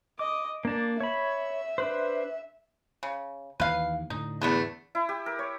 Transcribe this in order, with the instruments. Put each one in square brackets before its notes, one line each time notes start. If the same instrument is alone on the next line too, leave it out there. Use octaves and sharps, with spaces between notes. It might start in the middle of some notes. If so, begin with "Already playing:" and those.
[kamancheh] D#5 [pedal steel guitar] D6
[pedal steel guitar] A#3 A5 [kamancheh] D4
[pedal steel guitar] C#5 B5 [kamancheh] E5
[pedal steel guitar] D4 B4 C5
[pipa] C#3
[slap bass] D#2 E3 [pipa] B4 F5
[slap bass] A2 D3 [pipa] D#4
[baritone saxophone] E2 [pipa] A3 B3 D4
[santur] E4
G4
A#4
C#5